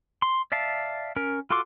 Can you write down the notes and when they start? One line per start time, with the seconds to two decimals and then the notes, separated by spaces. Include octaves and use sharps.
0.22 C6
0.52 D5 E5 F5 A5
1.16 C#4 A#4
1.50 F4 F#4 A4 C6 D6